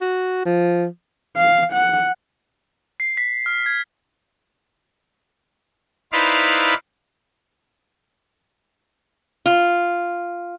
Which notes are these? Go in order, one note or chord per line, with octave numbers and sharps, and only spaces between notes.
F#4
F3
F5
F#5
C7
B6
F6
G#6
D#4 E4 B4 C5 D5 F5
F4